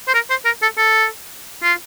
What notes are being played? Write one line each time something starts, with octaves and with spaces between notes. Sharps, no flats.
C5
A#4
C5
A#4
A4
A4
F4